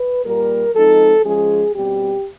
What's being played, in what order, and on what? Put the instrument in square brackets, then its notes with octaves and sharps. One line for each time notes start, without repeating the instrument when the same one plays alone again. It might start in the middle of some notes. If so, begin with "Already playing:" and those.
Already playing: [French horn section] B4
A#2 G3 A#3 A#4
F3 G#3 C4 D#4 A4
F3 G#3 C#4 G#4
B2 G3 C4 G4